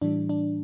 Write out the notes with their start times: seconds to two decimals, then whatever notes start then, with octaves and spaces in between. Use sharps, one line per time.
0.02 A2 E3 G3 D4
0.29 D4